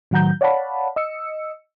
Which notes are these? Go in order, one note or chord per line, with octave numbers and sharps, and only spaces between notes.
A2 D#3 F#3 F#5 A#5 G6
C#5 D5 F5 F#5 A5 B5
D#5 E6 C#7